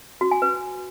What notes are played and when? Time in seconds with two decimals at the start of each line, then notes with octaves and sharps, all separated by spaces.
0.21 F#4
0.31 G#5
0.42 B4